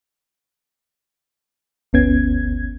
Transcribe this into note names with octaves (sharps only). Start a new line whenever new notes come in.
G1 D2 B3 C#4 G#6